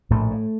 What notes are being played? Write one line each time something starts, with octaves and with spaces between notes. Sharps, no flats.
A#1 A2 A3
A2